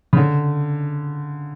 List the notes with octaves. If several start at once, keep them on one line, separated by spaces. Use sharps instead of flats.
C#3
D3